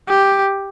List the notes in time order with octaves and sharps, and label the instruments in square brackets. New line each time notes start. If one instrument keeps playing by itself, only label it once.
[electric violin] G4